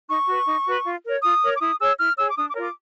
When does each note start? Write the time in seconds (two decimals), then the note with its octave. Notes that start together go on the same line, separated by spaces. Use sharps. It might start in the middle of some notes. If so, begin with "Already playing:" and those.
0.09 D#4 C#6
0.28 F#4 B4
0.46 D#4
0.66 F#4 B4
0.85 F4
1.04 A#4 C#5
1.23 F4 D#6
1.41 A#4 C#5
1.55 D6
1.60 E4 D#6
1.79 G#4 C#5 E6
1.98 E4 F6
2.17 G#4 C#5 E6
2.31 D6
2.36 D4 D#6
2.49 D6
2.55 F4 A#4 C#5
2.62 D6